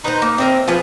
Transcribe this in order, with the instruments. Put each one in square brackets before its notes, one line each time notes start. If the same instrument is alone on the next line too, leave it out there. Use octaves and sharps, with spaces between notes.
[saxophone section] D#4 [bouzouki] B4 C5
[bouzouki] A#3
[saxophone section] C4 [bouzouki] A#4 D#5 E5
[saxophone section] F3 [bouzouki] F4 G#4 B4